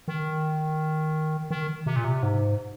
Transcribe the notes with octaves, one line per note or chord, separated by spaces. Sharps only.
D#3
D#3
C3
A#2
C3
G#2